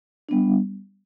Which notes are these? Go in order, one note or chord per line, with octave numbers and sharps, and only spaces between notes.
G3 B3 D4